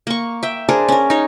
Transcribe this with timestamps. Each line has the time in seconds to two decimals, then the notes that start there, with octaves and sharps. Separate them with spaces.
0.07 A#3 C#6
0.43 E5 G5
0.69 D4 G#4 A#4 C5
0.88 C#4 A#4
1.10 D#4 C#5